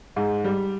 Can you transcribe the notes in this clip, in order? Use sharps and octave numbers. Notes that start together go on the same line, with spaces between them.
G#2
G3